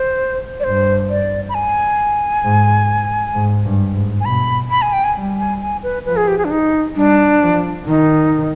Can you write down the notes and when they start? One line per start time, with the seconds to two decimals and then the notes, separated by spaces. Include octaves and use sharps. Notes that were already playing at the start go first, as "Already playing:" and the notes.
Already playing: C5
0.60 D5
0.64 G2 C5
1.09 D5
1.49 B5
1.55 G#5
2.44 G#2
3.35 G#2
3.65 G2
3.95 G#2
4.21 G#5
4.25 B2 B5
4.71 B5
4.82 G#5
4.93 G5
5.04 G#5
5.15 G3
5.38 G#5
5.61 G#5
5.83 B4
6.06 F3 B4
6.17 G#4
6.28 G4
6.38 G#4
6.45 D4
6.51 D#4
6.96 G3 D4
7.42 F3
7.86 D#3 D#4